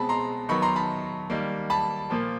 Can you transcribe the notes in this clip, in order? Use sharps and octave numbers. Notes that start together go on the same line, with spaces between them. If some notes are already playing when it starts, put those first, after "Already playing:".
Already playing: B2 G#3 C4 A5 B5
A#5 C6
D#3 F#3 B3 B5 C#6
A#5 C6
A5 B5
D#3 G3 A#3
A5 B5
A#2 F3 A#3